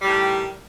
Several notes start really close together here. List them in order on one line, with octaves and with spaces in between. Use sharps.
G3 A2 D#3